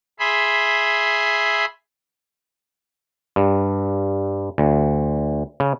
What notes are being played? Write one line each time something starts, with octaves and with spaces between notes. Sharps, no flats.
G#4 E5 B5 C6
G2
D2
C#3